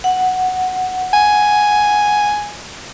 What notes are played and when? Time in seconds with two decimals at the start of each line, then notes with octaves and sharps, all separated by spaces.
0.04 F#5
1.14 G#5